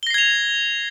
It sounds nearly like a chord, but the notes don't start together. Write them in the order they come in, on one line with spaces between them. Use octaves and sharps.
G7 A#6 C7 G#6 F7